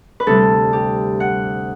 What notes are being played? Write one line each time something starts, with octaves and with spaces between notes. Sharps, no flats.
B4
D2 C3 G3 A4
G4
F#5